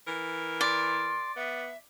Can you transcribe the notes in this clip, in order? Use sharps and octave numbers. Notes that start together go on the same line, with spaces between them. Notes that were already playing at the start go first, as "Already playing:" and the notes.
E3 A#4
D5 C6
B3 E5